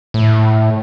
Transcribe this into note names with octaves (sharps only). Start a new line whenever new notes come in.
A2